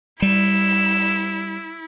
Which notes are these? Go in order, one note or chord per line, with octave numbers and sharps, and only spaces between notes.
G3 E4 E7